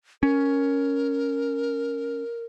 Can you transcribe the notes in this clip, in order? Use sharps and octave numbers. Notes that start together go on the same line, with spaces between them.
C#4 A#4